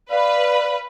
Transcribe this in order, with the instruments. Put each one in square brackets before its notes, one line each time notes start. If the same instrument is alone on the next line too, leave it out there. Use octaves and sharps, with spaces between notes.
[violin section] B4 [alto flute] D5 [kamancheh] F5